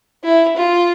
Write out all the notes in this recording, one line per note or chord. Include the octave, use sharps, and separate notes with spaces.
E4
F4